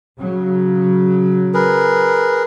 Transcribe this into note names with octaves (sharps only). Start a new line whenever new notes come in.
C#3 F#3
G#4 A#4 B4